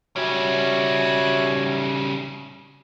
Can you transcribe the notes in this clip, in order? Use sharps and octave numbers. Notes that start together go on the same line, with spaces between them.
C#3 G3 F#4 C#5 E5